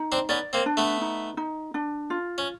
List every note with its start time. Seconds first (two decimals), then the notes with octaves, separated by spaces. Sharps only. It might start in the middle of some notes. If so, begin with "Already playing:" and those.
Already playing: D#4
0.12 C4 D4
0.29 B3 C#4 D5
0.53 A#3 C4
0.66 D4
0.77 A3 B3
1.01 D#4
1.37 D#4
1.74 D4
2.10 F4
2.38 C#4